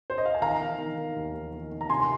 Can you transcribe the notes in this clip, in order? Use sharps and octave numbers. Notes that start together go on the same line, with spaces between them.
C5
D#5
F5
G#5
D#3 F5 A#5
D#3
D#3
D#3
D#2
D#3
D#3
D#3
A#5
C3 G#5 C6
C6